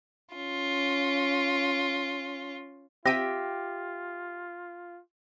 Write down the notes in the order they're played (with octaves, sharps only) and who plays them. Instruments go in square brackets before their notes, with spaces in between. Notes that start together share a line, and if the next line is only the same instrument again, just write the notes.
[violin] C#4 F4
[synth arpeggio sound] C4 D#7 [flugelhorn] F4 [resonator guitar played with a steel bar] G4 E5 G5 [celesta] A#6